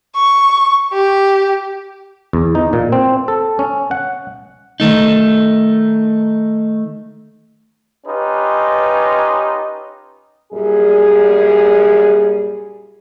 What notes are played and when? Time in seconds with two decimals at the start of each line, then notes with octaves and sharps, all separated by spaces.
0.16 C#6
0.93 G4
2.33 E2
2.55 D#4
2.73 A#2
2.92 C4
3.28 A4
3.59 C#4
3.91 F#5
4.80 D#3 A3 D#4
8.06 C#4 D#4 F4 G4 B4
10.53 F#2 A#2 G3 G#4